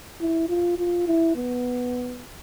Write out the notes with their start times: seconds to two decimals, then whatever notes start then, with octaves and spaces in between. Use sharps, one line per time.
0.21 E4
0.49 F4
0.78 F4
1.07 E4
1.36 B3